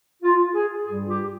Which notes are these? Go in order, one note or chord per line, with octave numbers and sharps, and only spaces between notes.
F4
G#4
G2 G3 G#4
F4
G4